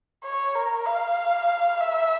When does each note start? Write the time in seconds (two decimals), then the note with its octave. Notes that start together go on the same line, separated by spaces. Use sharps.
0.24 C#5
0.55 A#4
0.86 F5
1.80 E5